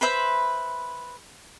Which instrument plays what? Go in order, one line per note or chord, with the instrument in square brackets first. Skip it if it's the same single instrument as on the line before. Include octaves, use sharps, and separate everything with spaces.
[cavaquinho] B4 C5 E5 B5